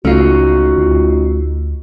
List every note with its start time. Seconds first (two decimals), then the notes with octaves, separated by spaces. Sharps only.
0.05 C#2 A3 C#4 D#4 F4 F#4
0.78 D2